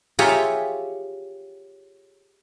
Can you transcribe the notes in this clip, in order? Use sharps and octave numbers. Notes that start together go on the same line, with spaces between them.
F4 G4 G#4 C#5 E5 A#5